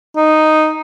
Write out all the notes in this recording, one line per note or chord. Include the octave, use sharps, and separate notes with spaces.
D#4